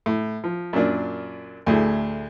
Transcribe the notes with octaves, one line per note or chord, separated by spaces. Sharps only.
A2
F3
F#2 A#2 D4
D2 A2 G#4